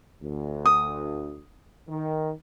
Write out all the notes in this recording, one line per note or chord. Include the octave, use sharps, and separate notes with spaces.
D2
D#6
D#3